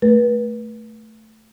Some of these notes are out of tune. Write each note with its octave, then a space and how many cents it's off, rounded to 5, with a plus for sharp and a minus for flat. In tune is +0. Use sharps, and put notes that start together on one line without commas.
A3 +0 B4 -30